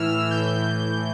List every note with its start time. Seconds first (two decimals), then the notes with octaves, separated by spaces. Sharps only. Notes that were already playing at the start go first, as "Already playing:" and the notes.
Already playing: A2 E3 E6 F6
0.31 A2 E3 G6